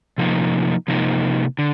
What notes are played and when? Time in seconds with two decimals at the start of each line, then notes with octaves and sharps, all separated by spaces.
0.18 C3 F3 A#3 D#4
0.88 C3 F3 A#3 D#4
1.59 D3